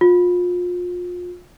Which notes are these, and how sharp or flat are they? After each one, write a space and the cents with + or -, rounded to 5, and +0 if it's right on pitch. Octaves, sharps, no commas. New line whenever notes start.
F4 +30